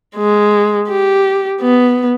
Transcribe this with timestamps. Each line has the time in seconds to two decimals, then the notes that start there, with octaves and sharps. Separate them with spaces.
0.16 G#3
0.89 G4
1.61 B3